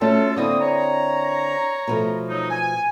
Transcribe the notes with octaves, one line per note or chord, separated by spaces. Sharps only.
A3 C#4 F4 F#4 A4 A5
D3 A#3 C4 E4 D#6
C#5 A#5
B2 F3 A3
F#3 D#4
G#5